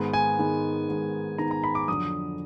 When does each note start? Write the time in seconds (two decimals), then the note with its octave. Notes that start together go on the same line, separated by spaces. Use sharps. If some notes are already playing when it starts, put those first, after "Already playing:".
Already playing: G#2 D#3 G#3 B3
0.13 G#5
0.39 G#2 D#3 G#3 B3
0.89 G#2 D#3 G#3 B3
1.38 G#2 D#3 G#3 B3 A#5
1.51 A#5
1.64 B5
1.75 D6
1.88 F2 D3 F#3 D#6